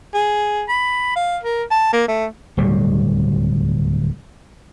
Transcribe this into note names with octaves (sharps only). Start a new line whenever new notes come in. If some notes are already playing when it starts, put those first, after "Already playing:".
G#4
B5
F5
A#4
A5
A#3
A3
D1 D#2 B2 G3